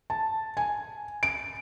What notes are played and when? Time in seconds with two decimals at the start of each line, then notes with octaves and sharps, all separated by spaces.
0.10 A5
0.57 G#5
1.23 D7